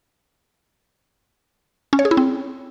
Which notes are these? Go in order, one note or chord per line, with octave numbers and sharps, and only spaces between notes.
C#4
C#5
G#4
E4
C4